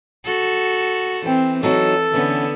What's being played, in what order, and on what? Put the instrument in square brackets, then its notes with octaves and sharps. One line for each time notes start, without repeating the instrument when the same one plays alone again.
[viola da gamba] F#4 A4
[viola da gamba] E3 [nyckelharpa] C4 [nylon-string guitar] G5
[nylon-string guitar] F#3 D#4 F#4 [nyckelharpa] A4
[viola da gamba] D3 B3 [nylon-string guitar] E3 C#4